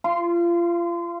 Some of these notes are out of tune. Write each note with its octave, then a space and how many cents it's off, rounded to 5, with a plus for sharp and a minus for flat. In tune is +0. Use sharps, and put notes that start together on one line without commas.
F4 -30 C6 +0